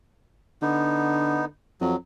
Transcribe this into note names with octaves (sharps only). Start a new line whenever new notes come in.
D3 B3 D#4
F2 F#3